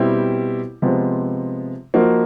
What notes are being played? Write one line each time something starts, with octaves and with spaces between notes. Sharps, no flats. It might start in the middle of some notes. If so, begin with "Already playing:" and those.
Already playing: B2 G3 C4 E4 G4
C3 F3 G#3 B3
F3 A#3 D#4 F#4